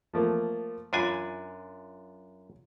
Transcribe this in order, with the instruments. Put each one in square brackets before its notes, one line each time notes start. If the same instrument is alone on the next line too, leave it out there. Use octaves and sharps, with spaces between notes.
[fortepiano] F3 A3 A#3
[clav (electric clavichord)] F#2 D4 G#5 [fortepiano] F4 B5